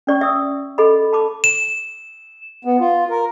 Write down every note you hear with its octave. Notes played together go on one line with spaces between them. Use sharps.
C#4 D5 C#6
E5 D#6 E6
A4 D#5 B5
A5 B5 D6
E7
B3
F4
A#4